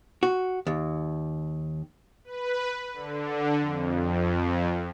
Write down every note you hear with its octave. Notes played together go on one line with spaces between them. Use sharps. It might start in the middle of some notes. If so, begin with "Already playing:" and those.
F#4
D#2
B4
D3
F2